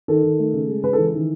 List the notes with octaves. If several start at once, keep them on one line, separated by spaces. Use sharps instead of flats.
D#3 A4
D#3
A3
C#3
G#3
C#3 B4
E3 A4
D#3